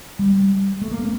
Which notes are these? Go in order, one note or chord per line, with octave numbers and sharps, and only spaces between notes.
G3
A3
A#3
C4